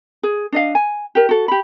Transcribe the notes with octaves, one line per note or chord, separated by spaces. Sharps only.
G#4
D4 D#5 F5
G#5
G4 A#4
F#4 A4
G4 B5